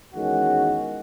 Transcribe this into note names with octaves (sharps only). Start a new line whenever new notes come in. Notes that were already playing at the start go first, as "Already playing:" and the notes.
E2 D#3 G#3 C#4 F#4